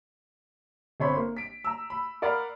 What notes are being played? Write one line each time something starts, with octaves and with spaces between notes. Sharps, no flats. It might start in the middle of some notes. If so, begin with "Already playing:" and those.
G1 C4 C#5 B5 C6
A#3
B6 D7
A#5 E6
B5
A#4 D5 F5 F#5 B5